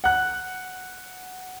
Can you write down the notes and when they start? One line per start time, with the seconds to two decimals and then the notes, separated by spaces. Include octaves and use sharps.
0.04 F#5 F#6